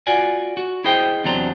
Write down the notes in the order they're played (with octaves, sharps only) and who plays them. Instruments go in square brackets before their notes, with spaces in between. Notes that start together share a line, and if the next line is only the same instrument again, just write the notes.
[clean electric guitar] F4 F#4 D5 G#5
F#4
E4 G#4 C5 D#5 G5
E2 C3 F#3 D4 C5 A#5